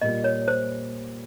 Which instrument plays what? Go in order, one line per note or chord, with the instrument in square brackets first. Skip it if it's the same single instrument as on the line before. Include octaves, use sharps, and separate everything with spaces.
[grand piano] A#2 G3 A#3 [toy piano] D#5
[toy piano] C#5
C5